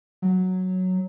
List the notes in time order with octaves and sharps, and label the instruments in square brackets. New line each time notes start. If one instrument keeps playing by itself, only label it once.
[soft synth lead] F#3